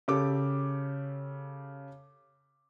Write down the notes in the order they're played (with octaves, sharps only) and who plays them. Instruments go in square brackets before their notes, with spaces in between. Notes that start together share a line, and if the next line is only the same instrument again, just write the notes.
[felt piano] C#3 G4 A4 D6